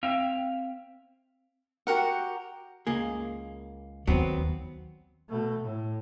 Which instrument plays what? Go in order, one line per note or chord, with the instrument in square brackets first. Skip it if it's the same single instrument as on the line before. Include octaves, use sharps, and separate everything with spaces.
[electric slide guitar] C4 E5 F5 G5
[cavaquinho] F#4 G4 A#4 F#5
[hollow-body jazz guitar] C#2 A#3 G#4
[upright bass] D#2 [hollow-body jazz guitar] F#3 B3 C4
[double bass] B2 A3
A2